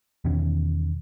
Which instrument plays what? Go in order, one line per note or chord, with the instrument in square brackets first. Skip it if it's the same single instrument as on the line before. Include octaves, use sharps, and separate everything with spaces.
[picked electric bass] E2 B2 D#3 C#4